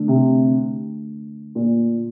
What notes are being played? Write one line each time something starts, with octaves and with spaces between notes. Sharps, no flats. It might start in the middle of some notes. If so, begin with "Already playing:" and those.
Already playing: D3 A3 D4
C3
A#2